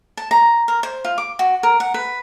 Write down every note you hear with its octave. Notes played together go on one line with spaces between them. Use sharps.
A5
A#5
A#4
C5
F4
D6
F#4
A#4
F#5
B4